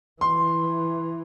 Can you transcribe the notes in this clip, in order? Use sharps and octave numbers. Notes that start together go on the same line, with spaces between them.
E3 C6